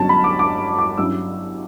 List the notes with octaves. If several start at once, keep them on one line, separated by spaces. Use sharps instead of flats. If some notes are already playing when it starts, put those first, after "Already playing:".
Already playing: G1 G2 F#3 C#4 A5
B5
D6
D6
D6
G2 F#3 C#4 E4 E6